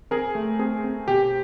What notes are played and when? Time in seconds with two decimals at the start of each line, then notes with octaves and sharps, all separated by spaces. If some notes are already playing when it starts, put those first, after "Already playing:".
0.11 C4 G#4 A#4
0.35 A3
0.59 C4 G#4
0.84 C4
1.07 B2 G4